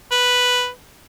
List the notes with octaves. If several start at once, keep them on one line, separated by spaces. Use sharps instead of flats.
B4